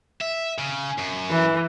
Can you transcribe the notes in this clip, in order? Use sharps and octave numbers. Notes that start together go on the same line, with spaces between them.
E5
C#3
F#2
E3